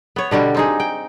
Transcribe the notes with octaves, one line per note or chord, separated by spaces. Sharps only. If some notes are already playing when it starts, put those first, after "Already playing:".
B3 C#5
B2 D3 G3 F#4
C4 D#4 G#4
G5